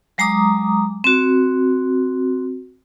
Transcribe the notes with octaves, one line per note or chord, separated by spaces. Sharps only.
F#3 G#3 A#5 D6 D#6
C4 F#4